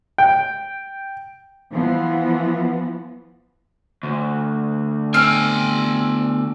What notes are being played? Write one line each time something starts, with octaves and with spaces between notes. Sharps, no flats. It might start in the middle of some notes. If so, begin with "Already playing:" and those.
G5
E3 F3 B3
D2
B3 C4 G5 G#5 F6